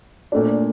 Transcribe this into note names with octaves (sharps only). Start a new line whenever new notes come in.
A#2 A3 D4